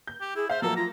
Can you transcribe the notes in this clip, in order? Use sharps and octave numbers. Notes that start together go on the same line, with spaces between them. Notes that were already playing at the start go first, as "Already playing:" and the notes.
G6
G4
E4 G#4
C5 E5 F5
F3 F#3 A#3 A4 A#5
F4 A#5